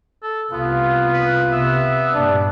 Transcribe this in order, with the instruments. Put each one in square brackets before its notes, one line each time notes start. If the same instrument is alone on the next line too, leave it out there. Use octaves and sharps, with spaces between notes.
[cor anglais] A4
[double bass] C2 [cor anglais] B3 [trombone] F4
[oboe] B4
[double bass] C3 [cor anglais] B3 [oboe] E5
[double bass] G2 A#2 [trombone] D4